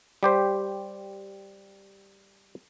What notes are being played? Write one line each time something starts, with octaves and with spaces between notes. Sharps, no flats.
G3 G4 C5